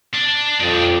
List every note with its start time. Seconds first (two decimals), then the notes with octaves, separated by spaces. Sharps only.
0.14 D4
0.60 F2 D#4 D5